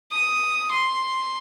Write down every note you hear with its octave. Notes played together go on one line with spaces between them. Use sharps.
D#6
C6